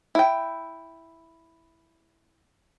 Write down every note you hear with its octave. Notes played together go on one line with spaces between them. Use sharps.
E4 G5